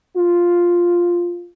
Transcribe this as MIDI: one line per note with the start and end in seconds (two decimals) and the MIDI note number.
0.16 1.50 65